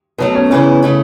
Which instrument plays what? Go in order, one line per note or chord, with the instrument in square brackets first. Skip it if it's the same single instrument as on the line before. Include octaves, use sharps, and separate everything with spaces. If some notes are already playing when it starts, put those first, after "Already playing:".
[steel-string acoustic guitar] B2 F#3 A3 [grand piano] B3
[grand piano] C#4
[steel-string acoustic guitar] E2 C#3 E3 B3 E4 [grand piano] C#4
[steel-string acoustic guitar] C#3 A3 E4